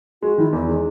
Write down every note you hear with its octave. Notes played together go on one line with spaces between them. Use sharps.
G#3 F#4
D#3 E4
E2 E4
G#3 D#4